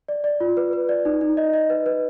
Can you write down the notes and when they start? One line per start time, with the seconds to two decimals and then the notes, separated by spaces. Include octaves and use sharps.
0.08 D5
0.24 D5
0.40 F4
0.57 B4
0.73 B4
0.89 D5
1.05 D#4
1.21 D#4
1.37 D#5
1.53 D#5
1.70 B4
1.86 B4